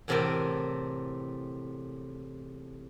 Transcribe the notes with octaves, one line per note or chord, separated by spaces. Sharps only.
E2 A2 C3 A4 A#4 G5